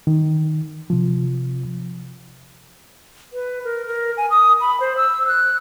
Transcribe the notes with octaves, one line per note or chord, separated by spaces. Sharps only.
D#3
C3 F3
B4
A#4
A#4
G#5
D#6
B5
C5
E6
F#6